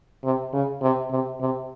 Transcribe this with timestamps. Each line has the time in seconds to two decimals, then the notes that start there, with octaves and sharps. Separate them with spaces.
0.24 C3
0.53 C#3
0.81 C3
1.10 C3
1.40 C3